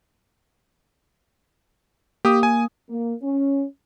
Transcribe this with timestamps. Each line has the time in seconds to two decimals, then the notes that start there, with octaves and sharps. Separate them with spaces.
2.25 A#3 G4 D#6
2.43 G#5
2.90 A#3
3.22 C#4